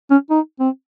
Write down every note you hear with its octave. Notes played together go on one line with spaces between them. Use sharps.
C#4
D#4
C4